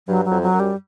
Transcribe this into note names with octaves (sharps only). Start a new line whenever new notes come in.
G2 F#3
F#3
F2
F#3
F#2
G3